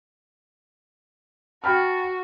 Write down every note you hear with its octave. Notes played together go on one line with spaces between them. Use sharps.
F#4 G5 A5 B5 F6